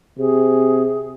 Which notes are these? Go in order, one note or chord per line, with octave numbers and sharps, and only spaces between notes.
C3 G#4